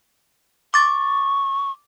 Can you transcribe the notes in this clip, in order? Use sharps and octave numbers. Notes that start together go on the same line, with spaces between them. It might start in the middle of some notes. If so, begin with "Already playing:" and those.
C#6 D6 A6